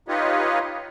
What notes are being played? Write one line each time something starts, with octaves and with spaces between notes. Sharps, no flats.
D#4 F4 G4 B4 C#5 D#5